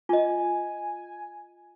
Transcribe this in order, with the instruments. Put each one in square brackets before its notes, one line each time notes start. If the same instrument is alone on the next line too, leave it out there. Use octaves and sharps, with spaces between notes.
[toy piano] F4 D#5 [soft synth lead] G#5